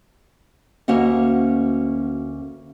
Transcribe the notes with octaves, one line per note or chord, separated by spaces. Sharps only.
D2 A#3 C#4 F#4 D#5